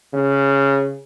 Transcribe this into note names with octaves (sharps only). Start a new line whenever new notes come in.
C#3